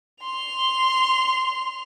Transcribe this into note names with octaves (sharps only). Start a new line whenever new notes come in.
C6 F7